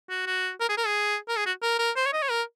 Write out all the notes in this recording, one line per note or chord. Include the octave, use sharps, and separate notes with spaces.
F#4
F#4
A#4
G#4
A#4
G#4
A#4
G#4
F#4
A#4
A#4
C5
C#5
D#5
C#5
A#4